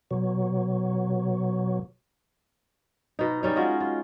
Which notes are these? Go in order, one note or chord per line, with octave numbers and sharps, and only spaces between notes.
B2 F#3
B2 D#4
G3 C#4 D#4
G#3 F4 F#4 D#5
F4